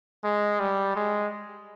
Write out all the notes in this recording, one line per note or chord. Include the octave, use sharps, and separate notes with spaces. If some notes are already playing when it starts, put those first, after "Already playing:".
G#3
G3
G#3